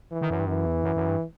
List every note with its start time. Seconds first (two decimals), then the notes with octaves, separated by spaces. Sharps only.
0.12 E3
0.21 D#3
0.30 F#2
0.40 G2
0.48 F#2 E3
0.66 E2
0.83 F#2
0.96 F#2
1.08 G2